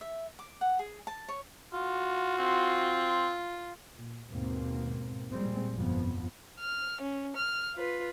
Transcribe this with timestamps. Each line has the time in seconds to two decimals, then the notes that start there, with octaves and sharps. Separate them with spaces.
0.01 E5
0.39 D6
0.61 F#5
0.79 G#4
1.07 A5
1.28 C#5
1.73 F4 F#4
2.38 C4 F4
3.94 A#2
4.30 D#2 G#2 B2 A#3 C4
5.31 A#2 F3 G3 G#3 C4
5.73 G1 F2 F3 B3
6.60 F6
7.01 C#4
7.37 F6
7.75 F4 B4